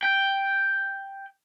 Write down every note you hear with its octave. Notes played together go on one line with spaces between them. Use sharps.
G5